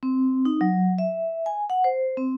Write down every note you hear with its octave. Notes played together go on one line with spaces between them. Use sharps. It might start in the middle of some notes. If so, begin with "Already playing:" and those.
C4
D#4
F#3
E5
G#5
F#5
C5
C4